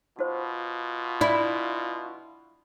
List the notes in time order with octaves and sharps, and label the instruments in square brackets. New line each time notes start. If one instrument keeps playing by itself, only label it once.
[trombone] B2 [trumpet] F4 [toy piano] F#4 C5
[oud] E4 [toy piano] D5